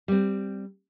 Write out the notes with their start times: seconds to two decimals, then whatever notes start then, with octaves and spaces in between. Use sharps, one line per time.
0.08 G3 C4